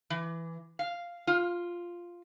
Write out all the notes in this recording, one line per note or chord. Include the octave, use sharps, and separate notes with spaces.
E3
F5
F4